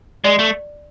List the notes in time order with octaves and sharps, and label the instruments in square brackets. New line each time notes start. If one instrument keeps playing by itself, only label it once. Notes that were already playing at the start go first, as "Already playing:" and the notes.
[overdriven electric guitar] G#3 [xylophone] D5
[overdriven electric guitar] A3